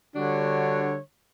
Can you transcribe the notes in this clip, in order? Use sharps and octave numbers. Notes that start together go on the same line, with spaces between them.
D3 G3 D4 F#4 C#5